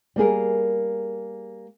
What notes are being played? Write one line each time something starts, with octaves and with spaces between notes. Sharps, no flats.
G3 A#3 G#4 A#4